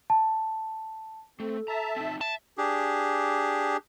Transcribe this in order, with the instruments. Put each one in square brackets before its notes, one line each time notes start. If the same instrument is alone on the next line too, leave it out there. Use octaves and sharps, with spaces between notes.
[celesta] A5
[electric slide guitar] A3 [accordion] C4 [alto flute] A4
[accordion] E5 A5 [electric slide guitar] A#5
[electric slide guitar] C4 D#4
[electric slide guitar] E5 [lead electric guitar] A5
[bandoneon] D4 G4 G#4